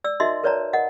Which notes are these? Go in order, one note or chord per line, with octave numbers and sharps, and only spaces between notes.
D5 E6
D#4 F#4 A#4 D#5 E5 C6
A#4 B4 C#5 D5 A5 A#5
A#4 D#5 F#5